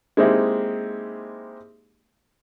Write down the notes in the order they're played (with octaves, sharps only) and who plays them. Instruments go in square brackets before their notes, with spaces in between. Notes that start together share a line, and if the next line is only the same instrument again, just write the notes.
[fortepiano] G#3 A#3 C4 D#4 E4 G4